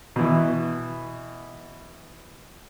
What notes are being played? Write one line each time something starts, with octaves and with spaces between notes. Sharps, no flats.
B2 E3